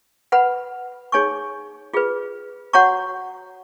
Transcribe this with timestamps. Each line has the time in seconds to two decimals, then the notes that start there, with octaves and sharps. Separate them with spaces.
0.32 B4 F#5 B5
1.12 D#4 G#4 C#5 G#5 C#6
1.94 F4 G#4 B4
2.73 F#4 C#5 F#5 A#5 C#6